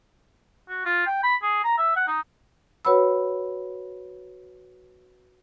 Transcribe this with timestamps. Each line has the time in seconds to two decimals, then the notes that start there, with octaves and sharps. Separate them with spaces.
0.69 F#4
0.85 F4
1.06 G5
1.23 B5
1.43 G#4
1.64 A#5
1.78 E5
1.96 F#5
2.07 D#4
2.85 F#4 B4 C#5 F#5 B5 E6